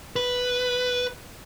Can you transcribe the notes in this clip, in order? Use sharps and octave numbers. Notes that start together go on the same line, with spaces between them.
B4